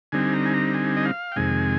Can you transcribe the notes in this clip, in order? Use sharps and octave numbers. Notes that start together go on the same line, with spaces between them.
D3 G3 C4 D#4 G#5
A#5
G#5
A#5
G#5
D#5
F5
G5
F2 C3 D#3 G#3 G#5